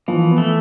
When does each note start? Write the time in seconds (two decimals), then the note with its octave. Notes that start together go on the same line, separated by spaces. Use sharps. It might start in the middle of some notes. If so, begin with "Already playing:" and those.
0.08 E3 F3
0.31 B3
0.38 A3